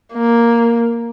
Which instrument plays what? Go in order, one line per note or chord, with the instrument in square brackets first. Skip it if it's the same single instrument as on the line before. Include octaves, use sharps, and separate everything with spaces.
[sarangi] A#3